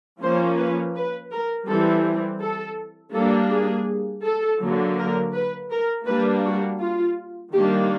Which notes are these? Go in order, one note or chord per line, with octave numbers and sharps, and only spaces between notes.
F3 A#3 C#4 C5
B4
B4
A#4
E3 G3 C4 A4
A4
G3 A#3 D4 A4
G#4
A4
D3 F#3 A#3
A#4
B4
A#4
G3 A#3 D4 B4
F#4
F4
D#3 G3 A#3 D4 G4